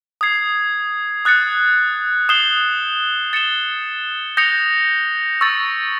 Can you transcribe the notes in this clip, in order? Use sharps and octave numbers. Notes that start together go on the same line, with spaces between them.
D#6 G#6 C7
D#6 F#6 A6 C#7
D#6 G6 C7 E7 G7
A6 C#7 E7 G7
D#6 G6 A#6 C#7 F7
C#6 E6 A6